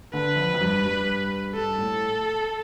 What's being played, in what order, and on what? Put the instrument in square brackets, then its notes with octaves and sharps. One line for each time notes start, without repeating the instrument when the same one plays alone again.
[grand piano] D3 [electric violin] B4
[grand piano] F2
F2
G2
G2
[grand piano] G2 [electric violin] A4
[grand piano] A2